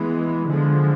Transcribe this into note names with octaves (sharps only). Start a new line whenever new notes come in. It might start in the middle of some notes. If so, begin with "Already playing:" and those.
Already playing: E3 G#3 B3
D3 F3 G#3